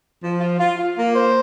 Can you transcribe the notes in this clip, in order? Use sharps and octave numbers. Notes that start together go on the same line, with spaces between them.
F3
F4
F4
F4
A#3
C5